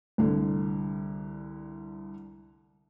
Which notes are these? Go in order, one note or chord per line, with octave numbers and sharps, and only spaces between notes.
C2 D3